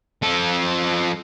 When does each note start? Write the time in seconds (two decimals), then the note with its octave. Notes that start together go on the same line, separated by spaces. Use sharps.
0.23 F3 A4